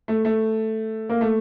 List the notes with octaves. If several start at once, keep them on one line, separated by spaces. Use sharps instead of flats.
A3
A3
A#3
A3